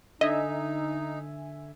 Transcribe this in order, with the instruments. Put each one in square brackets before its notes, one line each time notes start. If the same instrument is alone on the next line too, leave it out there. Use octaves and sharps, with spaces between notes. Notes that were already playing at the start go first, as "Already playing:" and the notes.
[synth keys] D3 E5 G#5 [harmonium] D#4 [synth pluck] D#5